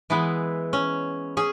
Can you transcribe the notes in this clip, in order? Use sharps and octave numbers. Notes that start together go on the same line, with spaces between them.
E3 G#3 B3 E4
C#4
C#4 G#4